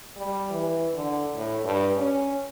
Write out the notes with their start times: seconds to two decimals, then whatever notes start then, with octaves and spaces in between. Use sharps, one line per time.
0.16 G3
0.50 E3
0.94 D3
1.35 A2
1.65 G2
1.96 C#4